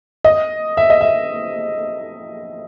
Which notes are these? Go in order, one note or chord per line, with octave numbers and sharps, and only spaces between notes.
D#5
E5
D#5
E5